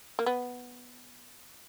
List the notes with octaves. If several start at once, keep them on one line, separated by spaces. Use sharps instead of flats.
A#3
B3